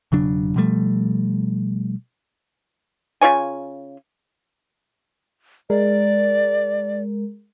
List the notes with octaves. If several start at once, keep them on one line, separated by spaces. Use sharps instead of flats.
E1 C#3 F#3 D4
B2 F3 G3 A3
C#3 F4 C#5 G#5
G#3 A#4 D5